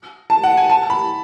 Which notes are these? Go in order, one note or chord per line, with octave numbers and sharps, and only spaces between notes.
A5
F#5
G#5
A5
B5